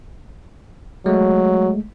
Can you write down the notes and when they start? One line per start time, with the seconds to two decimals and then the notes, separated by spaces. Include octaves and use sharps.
1.06 F#3 G#3 A3